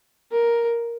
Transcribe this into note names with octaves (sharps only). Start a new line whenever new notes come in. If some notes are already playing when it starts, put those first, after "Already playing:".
A#4